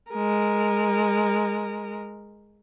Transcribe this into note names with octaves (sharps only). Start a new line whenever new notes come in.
G#3 A#4